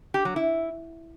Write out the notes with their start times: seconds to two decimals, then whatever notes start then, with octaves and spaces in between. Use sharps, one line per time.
0.14 G4
0.25 F#3
0.36 E4